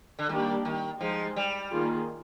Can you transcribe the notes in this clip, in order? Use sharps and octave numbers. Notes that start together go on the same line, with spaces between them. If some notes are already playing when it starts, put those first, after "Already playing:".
D3
D#3 G3 A#3 D4 G4 D5
D#3
F3 G#3 D#4 G#4 C5
G3
D#3 A#3 F4 G#4